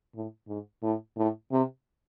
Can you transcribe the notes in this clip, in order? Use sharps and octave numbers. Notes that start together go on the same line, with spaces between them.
A2
G#2
A2
A2
C3